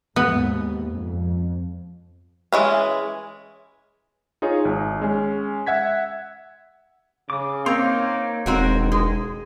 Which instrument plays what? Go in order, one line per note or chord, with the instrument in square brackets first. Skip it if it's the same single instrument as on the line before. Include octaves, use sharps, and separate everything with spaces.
[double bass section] D#2 G#2 [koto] B3
[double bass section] F2
[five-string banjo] E3 G#3 C#4
[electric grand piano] D#4 F4 G#4 C#5
G#1
G#3 C#4
E5 F#5 G#6 B6
[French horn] C#3 [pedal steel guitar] D6 D#6
[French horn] A#3 [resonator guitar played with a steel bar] C4 [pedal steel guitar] D#4 C#5 C6
[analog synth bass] E1 [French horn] D#3 [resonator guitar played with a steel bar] C4 F#4 A#4
[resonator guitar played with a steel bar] G#3